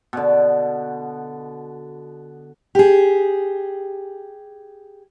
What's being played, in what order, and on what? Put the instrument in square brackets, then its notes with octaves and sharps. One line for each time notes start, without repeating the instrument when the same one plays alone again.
[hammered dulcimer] B2 D3
[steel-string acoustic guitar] G4 G#4